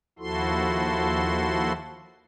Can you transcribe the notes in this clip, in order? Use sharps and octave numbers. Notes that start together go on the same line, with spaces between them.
D#2 F3 E4 F#4 A4 C6